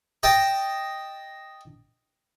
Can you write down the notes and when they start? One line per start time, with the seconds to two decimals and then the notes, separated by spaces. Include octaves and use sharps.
0.23 D#5 G5 A5